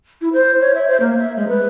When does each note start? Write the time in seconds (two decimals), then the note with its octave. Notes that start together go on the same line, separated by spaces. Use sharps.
0.21 E4
0.33 C5
0.61 C#5
0.75 E5
0.88 C5
1.00 A#3
1.17 E5
1.37 G#3
1.48 B4